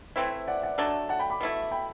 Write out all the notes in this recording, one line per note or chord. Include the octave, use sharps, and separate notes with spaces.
E3 A3 C4 E4 C5 E5
D5 F#5
D5 F#5
F#3 A3 D4 A4
F#5 A5
G5 B5
B5 D6
B2 A3 E4
G5 B5